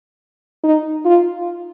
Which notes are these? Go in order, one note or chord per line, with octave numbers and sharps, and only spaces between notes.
D#4
F4